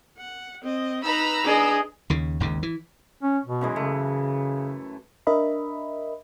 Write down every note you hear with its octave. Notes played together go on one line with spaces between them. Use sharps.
F#5
C4 D#5
D#4 B4 A#5 B5 E6
D4 G#4 D#5
D#2 C#3
G#1 D#2 C#3
E3
C#4
B2
F#2 E3 G#3
C#3 A3
D4 A#4 D#5 E5 B5